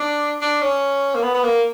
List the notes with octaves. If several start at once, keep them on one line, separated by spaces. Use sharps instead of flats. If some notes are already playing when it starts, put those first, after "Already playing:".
Already playing: D4
D4
C#4
A#3
B3
B3
A#3